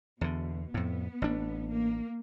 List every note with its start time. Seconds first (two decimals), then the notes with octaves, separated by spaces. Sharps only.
0.21 E2 B2 D3
0.74 F2 A2 B3
1.22 A1 D4
1.70 A#3